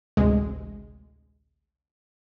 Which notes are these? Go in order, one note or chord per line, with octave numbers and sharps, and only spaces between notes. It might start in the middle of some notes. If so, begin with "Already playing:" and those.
A1 D2 C3 G#3